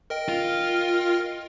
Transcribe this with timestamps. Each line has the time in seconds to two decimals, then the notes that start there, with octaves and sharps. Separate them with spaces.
0.10 A#4 D#5 G5
0.29 F4